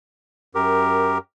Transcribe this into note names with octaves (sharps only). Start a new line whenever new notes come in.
F#2 G4 A#4